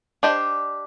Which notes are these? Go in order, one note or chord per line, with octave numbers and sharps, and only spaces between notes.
D4 G4 C5 D#5